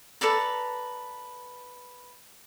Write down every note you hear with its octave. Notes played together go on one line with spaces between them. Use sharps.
A4 B4 D5 A#5